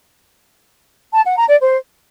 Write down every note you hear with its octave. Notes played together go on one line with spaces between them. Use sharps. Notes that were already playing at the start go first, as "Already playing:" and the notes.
A5
F#5
A#5
D5
C5